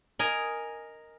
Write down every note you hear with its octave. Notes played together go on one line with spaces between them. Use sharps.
A#4 D#5 G#5